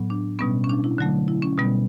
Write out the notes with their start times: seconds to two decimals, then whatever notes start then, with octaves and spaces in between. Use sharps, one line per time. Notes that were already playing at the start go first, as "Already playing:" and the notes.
Already playing: A2 F#3 B3
0.10 D4
0.39 B2 G3 B3 C#4
0.64 C#4
0.69 D4
0.84 E4
0.98 D3 F#3 A3
1.28 E4
1.42 C#4
1.58 B2 G3 B3